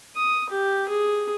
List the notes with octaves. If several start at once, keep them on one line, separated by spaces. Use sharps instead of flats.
D#6
G4
G#4